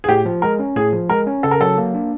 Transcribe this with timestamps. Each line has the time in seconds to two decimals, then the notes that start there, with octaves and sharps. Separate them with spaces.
0.04 G#4
0.09 A2 G4
0.26 F3
0.42 G#3 A#4
0.59 C#4
0.76 A2 G#4
0.93 F3
1.09 G#3 A#4
1.27 C#4
1.43 C#3 A4
1.51 A#4
1.60 F#3 A4
1.78 A#3
1.94 D4